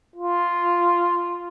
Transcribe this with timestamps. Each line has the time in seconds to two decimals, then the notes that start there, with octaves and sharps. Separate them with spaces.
0.16 F4